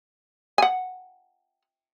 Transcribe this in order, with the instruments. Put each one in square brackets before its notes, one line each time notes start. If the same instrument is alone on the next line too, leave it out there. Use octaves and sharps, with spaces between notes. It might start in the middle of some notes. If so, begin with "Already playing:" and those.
[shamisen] F#5 G#5